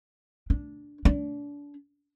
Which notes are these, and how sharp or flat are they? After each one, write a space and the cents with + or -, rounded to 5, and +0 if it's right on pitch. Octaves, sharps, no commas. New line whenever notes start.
D4 -10
D4 -30